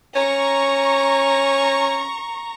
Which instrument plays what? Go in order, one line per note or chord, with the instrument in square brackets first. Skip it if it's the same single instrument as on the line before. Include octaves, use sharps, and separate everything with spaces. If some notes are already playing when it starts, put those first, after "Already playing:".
[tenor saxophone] C#4 [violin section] A#5 C#6